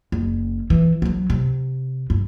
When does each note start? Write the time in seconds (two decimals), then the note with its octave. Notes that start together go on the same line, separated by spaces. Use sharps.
0.12 F#1
0.70 E3
1.02 F#3 G3
1.30 C3
2.10 G2